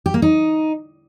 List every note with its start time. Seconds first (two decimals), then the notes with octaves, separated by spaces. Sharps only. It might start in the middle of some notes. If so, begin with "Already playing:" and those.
0.06 G4
0.14 A#3
0.22 D#4